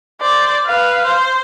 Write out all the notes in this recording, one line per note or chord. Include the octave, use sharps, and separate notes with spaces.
C5 D5
B4 F5
C5